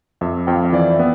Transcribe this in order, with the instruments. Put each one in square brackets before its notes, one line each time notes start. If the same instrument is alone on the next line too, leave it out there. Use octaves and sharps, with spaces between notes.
[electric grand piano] F2 [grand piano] E5
[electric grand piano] F2 [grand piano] G5
[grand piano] F5
E5
[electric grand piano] E3 [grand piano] D5
[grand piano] E5
[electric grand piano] B3